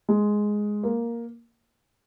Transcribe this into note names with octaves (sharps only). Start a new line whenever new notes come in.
G#3
A#3